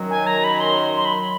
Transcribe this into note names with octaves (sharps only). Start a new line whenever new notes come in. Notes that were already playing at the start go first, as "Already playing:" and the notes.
Already playing: F#2 D#3 F#3
G#5
A#5
B5
C6
C6
B5